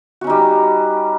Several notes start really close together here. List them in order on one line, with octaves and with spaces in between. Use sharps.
F#4 C#4 D#4 G3